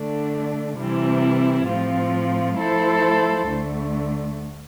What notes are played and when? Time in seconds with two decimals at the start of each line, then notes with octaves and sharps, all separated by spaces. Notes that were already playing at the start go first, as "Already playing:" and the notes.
Already playing: D3 A3 D4
0.78 C3 E3 G3 C4 E4
1.67 A2 F3 C4 F4
2.58 F3 A3 E4 A4 C5
3.48 D2 D3 A3